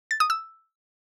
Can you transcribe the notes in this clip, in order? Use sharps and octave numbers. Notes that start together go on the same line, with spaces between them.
A6
D#6
E6